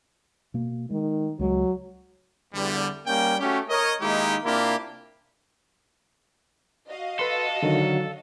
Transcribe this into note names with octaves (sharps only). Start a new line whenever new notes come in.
B2 A#3
D#3 G#3
C#2 F#3 G#3
E2 D3 G3
G3 A#3 C#4 G5
A3 C#4 F#4 G4
A#4 C#5 D#5
D#3 G#3 A#3 D#4 E4 G4
C3 A#3 D4 E4 F4 G4
F#4 D#5 F5
A4 B4 C6
D3 D#3 F#3